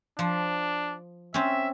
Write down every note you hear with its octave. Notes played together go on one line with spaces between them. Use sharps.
F3 D4
C4 C#4 E5